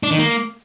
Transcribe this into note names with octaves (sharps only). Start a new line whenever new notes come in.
D4
D#3
A#3